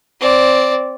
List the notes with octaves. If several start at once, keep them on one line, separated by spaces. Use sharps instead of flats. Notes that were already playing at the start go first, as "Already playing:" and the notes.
C4 D5